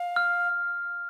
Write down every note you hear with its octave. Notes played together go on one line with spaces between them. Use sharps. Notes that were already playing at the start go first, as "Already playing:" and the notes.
Already playing: F5
F6